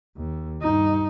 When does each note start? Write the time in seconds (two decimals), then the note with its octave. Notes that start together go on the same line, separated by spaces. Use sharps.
0.17 D#2
0.62 G2 D#4